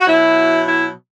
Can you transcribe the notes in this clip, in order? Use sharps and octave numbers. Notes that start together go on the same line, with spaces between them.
F#4
B2 F#3 E4
E4